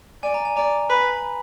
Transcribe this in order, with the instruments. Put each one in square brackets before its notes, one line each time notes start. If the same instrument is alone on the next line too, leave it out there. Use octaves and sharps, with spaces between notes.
[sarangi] D5 [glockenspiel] G#5
[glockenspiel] A#5
G#5
[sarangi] D5 [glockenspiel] A#5
[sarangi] B4 [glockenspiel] B5